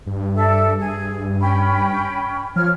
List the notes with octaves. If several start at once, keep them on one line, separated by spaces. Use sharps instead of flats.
G2
A4 D5 E5
G#4
C#4 G5 B5
F3 C#5 F6